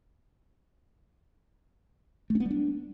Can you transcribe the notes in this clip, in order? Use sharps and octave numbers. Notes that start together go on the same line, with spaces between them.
A3
C#4
B3
G3
D4